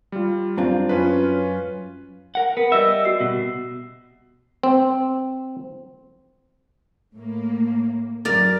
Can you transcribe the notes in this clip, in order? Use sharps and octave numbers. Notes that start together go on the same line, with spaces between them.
G3 F4
F#2 C4 D4 F4
F#2 C#4 F4 B4
A#4 F#5
B3 A#4
G3 D#5 E5 E6
F#4 E6 C7
B2
C4
A2 A#3
F#2 A#4 D5